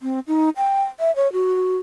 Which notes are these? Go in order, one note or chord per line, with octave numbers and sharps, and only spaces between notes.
C4
D#4
G5
E5
C#5
F#4